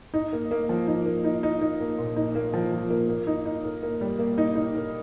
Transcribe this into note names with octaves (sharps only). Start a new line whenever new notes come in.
D#4
A#3
A#3
F3
D#4
A#3
D#4
D#4
D#4
A#3
A#2
D#4
A#3
F3
F3
A#3
A#3
D#4
D#4
A#4
A#3
G3
A#3
D#4
D#4
A#4